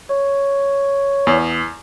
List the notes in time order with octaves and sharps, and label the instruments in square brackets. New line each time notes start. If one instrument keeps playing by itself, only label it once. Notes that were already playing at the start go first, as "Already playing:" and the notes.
[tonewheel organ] C#5
[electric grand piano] E2